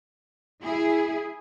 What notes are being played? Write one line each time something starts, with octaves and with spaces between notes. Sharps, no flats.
E4 G#4